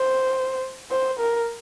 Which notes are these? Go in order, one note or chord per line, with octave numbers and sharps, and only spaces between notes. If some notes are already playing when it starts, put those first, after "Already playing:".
Already playing: C5
C5
A#4